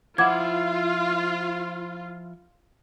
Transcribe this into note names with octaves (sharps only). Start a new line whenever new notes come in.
F3 E4 F4 F#5 D6 G#6